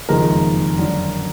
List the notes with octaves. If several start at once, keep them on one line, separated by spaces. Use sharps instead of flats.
F#1 F2 D#3 G#3 D#4 A#4
F#2 D3 F#3 D4